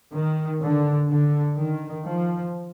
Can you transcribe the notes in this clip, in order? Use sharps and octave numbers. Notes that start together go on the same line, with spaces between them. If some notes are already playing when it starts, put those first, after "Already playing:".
D#3
D3
D3
D#3
F3